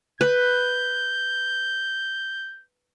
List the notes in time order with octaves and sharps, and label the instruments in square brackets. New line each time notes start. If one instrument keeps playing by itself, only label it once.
[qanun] B4 [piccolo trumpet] G6